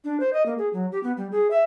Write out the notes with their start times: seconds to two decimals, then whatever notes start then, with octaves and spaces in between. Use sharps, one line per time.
0.04 D4
0.20 C5
0.33 D#5
0.46 A#3
0.58 G#4
0.73 F#3
0.92 G4
1.03 B3
1.17 G3
1.32 G#4
1.51 E5